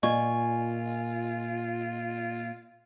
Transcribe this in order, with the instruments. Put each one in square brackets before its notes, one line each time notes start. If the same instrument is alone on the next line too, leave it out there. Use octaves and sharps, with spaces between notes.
[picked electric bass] A#2 [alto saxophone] F4 [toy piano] D5 D#5 C#6 [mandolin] G#5